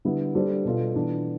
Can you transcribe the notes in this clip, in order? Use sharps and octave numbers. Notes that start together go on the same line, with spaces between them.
D3 G3 B3 E4
G3 D4 A4 C5
B2 B3 F4 A4
E3 B3 D4